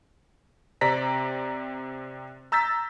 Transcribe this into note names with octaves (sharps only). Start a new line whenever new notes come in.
C3 C4 D5 A#5 A#6 B6
A#5 E6 G6 A6 B6